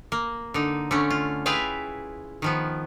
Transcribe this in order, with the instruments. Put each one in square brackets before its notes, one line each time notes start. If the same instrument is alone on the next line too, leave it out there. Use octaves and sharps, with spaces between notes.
[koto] A#3
D3 D#4
D3 A3 C#4
F4
E4 F4 G#4 B4 F5 G5
D#3 F3 B3